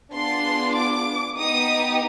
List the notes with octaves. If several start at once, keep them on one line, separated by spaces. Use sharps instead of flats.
B3 D4 F4 G#4 C6
D6
B3 D#4 G4 D#6